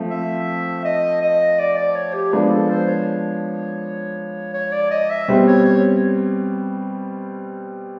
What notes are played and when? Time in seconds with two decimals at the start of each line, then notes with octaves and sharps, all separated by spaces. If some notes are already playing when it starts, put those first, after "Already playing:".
Already playing: F3 A3 C4
0.11 E5
0.85 D#5
1.22 D#5
1.59 D5
1.78 D5
1.95 C#5
2.14 G4
2.32 F3 G#3 B3 D4 G#4
2.51 A4
2.70 C5
2.88 C#5
4.54 C#5
4.72 D5
4.91 D#5
5.10 E5
5.28 B2 G3 C4
5.47 C#5
5.65 C#5